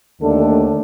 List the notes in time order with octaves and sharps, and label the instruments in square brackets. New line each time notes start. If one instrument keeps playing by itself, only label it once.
[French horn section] D#2 D3 A3 D4 A4